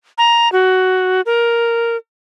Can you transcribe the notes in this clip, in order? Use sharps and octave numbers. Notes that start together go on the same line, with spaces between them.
A#5
F#4
A#4